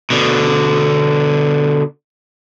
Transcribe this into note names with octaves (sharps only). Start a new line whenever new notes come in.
B2 D3